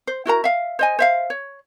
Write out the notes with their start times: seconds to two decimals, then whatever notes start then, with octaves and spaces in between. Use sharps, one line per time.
0.07 C5
0.25 E4 F#4 A#4 A#5
0.44 E5 F5
0.79 C5 D#5 G#5
0.99 C5 E5 F5
1.30 C#5